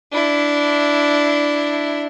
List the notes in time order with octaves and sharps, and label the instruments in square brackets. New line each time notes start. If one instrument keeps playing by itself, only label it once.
[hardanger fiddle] D4 E4